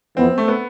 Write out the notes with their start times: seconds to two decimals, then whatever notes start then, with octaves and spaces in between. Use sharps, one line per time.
0.17 F2 E3 B3 C4
0.38 A3
0.48 B3